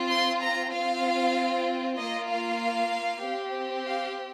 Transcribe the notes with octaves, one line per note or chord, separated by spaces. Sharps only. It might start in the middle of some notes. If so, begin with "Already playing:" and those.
Already playing: C4 F4
C6
A#5
C4 F4 F5
A#3 F4 D#5
F5
C4 G4
F5